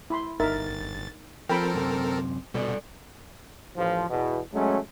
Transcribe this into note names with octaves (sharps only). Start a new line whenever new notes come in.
E4 B5 C6
G1 D#4 A#4 E5 A6
F3 C4 A4 A#4 G5 B5
F#2 C3
B2 G3 A4 D5
A1 F3
E2 B2
F#3 G#3 A3 C#4